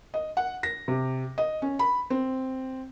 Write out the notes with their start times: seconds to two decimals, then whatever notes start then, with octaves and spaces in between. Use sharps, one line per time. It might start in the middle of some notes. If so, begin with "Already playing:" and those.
0.14 D#5
0.37 F#5
0.63 A#6
0.88 C3
1.38 D#5
1.62 C#4
1.79 B5
2.10 C4